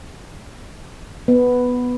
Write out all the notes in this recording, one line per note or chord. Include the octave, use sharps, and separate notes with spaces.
B3